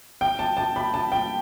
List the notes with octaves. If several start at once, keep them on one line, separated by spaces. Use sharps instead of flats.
G5
A5
A5
B5
A5
G5